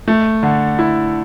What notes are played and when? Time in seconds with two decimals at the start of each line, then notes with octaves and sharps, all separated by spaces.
0.08 A3
0.43 D3
0.79 E4